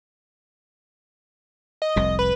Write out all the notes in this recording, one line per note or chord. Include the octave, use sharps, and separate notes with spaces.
D#5
F1 C2 C3
B4